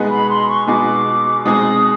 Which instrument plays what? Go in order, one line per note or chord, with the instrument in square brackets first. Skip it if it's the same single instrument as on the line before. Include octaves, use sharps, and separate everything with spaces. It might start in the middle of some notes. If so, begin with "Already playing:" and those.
Already playing: [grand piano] B2 G#3 B3 D#4 G#4
[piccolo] B5
C6
C#6
[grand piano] B2 G#3 B3 D#4 G#4 [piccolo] D6
[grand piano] B2 G#3 C4 D#4 G#4 [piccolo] D#6